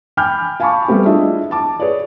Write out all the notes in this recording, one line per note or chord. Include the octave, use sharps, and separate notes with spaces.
G5 G#5 B5 D6 F6 G6
F5 G#5 A5 B5 C#6 D6
G3 A3 B3 C4 G4
D4 E4 F4 G#4 D#5 E5
A5 D6
G#4 B4 C#5 D5